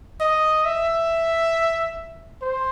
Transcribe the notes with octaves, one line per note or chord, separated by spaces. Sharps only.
D#5
E5
C5